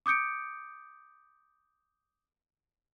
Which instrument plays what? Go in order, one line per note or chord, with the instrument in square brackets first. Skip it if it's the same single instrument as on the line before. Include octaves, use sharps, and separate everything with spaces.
[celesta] D6 D#6 G6 C#7 D7